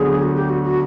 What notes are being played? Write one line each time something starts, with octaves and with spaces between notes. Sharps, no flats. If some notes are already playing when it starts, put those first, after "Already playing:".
Already playing: D2 D3 F#3 B3 G#4
F#4
G4
F#4
F#4